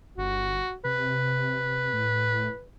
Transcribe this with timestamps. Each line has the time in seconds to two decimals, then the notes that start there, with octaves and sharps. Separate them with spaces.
0.18 G1 F#4
0.85 C3 B4
1.93 A2